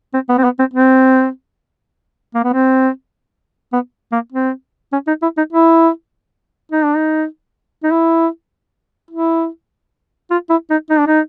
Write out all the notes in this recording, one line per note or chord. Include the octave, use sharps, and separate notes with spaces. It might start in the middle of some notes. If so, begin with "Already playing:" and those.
C4
B3
C4
B3
C4
C4
A#3
B3
C4
B3
A#3
C4
C#4
D#4
E4
D#4
E4
D#4
D4
D#4
D#4
E4
E4
F4
E4
D#4
D#4
D4
D#4